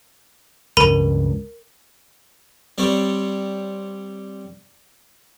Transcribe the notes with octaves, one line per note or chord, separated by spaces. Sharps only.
C#2 G2 A#4 B5 D#7
G3 C4 C#5 D5